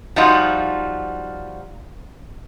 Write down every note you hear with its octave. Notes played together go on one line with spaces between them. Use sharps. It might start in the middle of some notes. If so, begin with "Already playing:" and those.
F3 G3 D#4 F4 F#4